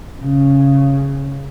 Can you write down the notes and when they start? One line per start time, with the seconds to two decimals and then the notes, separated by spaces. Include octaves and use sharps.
0.21 C#3